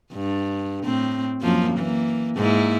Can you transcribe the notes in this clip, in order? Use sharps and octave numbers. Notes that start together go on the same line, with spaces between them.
G2
A2 C4
F#2 F3 A#3
E3 A#3
G#2 A#3 E4